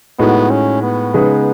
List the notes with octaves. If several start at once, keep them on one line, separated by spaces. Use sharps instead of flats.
A2 G#3 B3 D#4 F#4
C#4
B3
C#3 G#3 D#4 G#4 B4